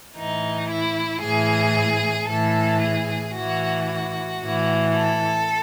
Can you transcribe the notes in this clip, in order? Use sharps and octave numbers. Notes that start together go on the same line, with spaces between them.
A2 E3 D#4
E4
A2 E3 G#4
A2 E3 A4
G#4
A2 E3 F#4
F#4
A2 E3
A4